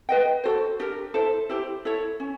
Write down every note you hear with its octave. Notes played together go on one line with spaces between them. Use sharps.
B4 D#5 G5
F#4 A4 C5
D4 G4 A#4
E4 A4 C5
E4 G4 C5
E4 A4 C#5
C#4